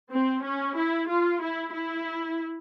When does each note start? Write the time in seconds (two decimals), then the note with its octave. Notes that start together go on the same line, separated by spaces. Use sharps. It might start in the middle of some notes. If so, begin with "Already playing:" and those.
0.12 C4
0.44 C#4
0.76 E4
1.08 F4
1.42 E4
1.73 E4